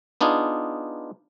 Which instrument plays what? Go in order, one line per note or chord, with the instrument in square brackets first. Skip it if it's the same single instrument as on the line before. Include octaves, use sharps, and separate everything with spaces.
[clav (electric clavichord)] B3 D4 D#4 F4 G#4